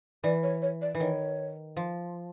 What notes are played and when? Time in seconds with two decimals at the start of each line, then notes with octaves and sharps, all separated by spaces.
0.24 E3 D5
0.43 C#5
0.62 C#5
0.82 D5
0.95 E3
1.00 D#3 C#5
1.77 F3